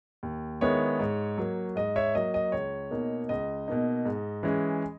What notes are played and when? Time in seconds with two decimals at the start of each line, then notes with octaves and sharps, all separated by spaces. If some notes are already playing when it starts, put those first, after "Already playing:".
0.23 D#2
0.61 D#3 G#3 B3 E4 C#5
0.99 G#2
1.38 F#3 A#3
1.76 G#2 D#5
1.96 C#5 E5
2.15 F#3 A#3 D#5
2.34 D#5
2.52 C#2 C#5
2.91 B2 A#3 D#4
3.29 C#2 D#5
3.68 B2 A#3 D#4
4.05 G#2
4.43 E3 G#3 C#4